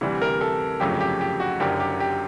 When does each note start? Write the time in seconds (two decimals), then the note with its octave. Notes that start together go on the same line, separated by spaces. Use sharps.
0.01 D2 C3 E3 G3
0.22 A#4
0.41 A4
0.80 G1 F2 C#3 F#3 A3 G4
1.01 G4
1.21 G4
1.40 F#4
1.60 F#1 F#2 D3 G4
1.80 G4
2.00 G4